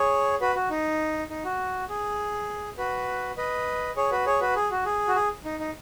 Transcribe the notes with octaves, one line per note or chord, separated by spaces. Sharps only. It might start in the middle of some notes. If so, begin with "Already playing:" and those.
Already playing: G#4 C#5
F#4 B4
F#4
D#4
D#4
F#4
G#4
F#4 B4
B4 D#5
G#4 C#5
F#4 B4
G#4 C#5
F#4 B4
G#4
F#4
G#4
F#4
G#4
D#4
D#4